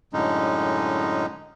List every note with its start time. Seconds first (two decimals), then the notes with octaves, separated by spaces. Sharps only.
0.13 F#2 A2 D3 G#3 C#4 D#4